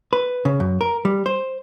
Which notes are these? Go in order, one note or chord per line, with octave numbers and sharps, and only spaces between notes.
B4
C#3
F#2
A#4
G3
C5